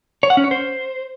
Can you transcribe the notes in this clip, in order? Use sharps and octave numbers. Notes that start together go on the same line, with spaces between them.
C#5
F#5
C#4
C#5
C5